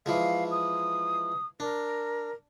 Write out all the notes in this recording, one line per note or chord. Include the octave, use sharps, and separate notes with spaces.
E3 F3 G#3 F5
D#6
D4 A#4